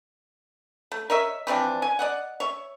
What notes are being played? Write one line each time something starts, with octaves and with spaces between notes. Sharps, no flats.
A3
A#4 C#5 D#5 E5
E3 F3 C4 D4
G#5
D5 D#5 F#5
C#5 E5